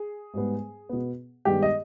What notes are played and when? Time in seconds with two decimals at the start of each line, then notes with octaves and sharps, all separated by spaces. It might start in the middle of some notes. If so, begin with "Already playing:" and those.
Already playing: G#4
0.34 G#2 G3 B3
0.89 B2 B3
1.45 G2 D#3 G#3 B3 G4
1.62 D#5